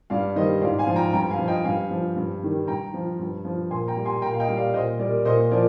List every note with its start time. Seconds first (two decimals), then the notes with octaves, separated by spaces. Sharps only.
0.10 G2 D5 F5
0.36 D#3 G3 C5 D#5
0.62 G#2 D5 F5
0.78 F5 G#5
0.87 F3
0.96 G5 A#5
1.13 G2 G5 A#5
1.30 F5 G#5
1.39 F3
1.48 D#5 G5
1.65 G2 F5 G#5
1.90 F3
2.16 G2
2.43 D#3 G3
2.68 G2 G5 A#5
2.94 F3
3.19 G2
3.45 F3
3.71 A#2 G#5 C6
3.88 G5 A#5
3.97 G3
4.05 G#5 C6
4.22 A#2 G5 A#5
4.34 F5
4.40 D#5 G5
4.48 G3
4.57 D5 F5
4.74 A#2 C5 D#5
4.99 G3 A#4 D5
5.25 A#2 C5 D#5
5.51 F3 A#4 D5